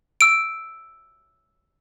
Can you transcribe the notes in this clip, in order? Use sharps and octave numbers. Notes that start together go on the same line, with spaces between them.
E6 D7